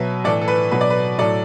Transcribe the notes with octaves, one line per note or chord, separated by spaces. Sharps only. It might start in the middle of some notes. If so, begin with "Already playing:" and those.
Already playing: B2 F#3 B4 E5
A2 E3 A4 D5
A4
B4
B2 F#3 B4
D5
B4
A2 F#3 A4 D5